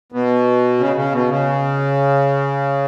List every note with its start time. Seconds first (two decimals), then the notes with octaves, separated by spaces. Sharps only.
0.12 B2
0.79 C#3
0.96 C#3
1.12 B2
1.29 C#3